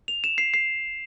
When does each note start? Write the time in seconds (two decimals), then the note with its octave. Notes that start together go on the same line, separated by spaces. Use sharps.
0.08 F7
0.24 E7
0.38 C7
0.54 C7